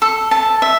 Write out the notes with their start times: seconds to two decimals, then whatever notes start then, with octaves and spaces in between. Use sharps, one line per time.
0.02 A4
0.31 A5
0.62 E5